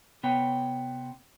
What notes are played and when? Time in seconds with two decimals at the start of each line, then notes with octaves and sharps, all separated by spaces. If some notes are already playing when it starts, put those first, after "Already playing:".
0.23 C3 B3 C#5 G5